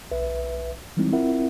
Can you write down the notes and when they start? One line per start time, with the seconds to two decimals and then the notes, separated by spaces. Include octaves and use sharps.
0.11 B1 B4 E5
0.97 E3 G3 G#3 C4 D#4 E4
1.12 C4 E4 F4 A#4 E5 F#5